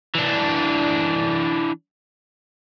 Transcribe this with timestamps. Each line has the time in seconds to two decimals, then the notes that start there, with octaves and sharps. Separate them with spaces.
0.15 E3 D4